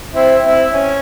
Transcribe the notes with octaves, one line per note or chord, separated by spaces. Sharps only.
C4 E4
C4 E4
C#4